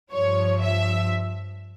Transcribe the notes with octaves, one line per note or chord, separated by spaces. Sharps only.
G2 F3 C#5
E5